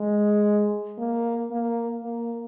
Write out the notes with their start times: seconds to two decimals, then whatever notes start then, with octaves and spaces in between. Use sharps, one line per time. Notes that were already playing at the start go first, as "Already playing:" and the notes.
Already playing: G#3
0.98 A#3
1.51 A#3
2.04 A#3